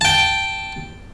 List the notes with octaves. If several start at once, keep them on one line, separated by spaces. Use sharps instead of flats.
G5 A5